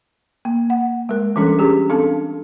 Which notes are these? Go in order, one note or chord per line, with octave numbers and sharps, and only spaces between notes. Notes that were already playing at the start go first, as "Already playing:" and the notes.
A#3
F#5
G#3 A#4
E3 G3 C#4 D4 A4 A#4
C#4 G4 G#4
C4 D4 A4 F5 A5